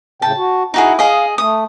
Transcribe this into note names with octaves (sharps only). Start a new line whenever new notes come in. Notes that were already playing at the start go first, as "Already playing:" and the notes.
A2 C#3 G5 A5
F#4
D#4 E4 F#4 G#4
G#4 D#5 F5
A3 D#6